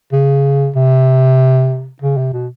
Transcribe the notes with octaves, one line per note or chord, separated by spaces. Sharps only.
C#3
C3
C#3
C3
B2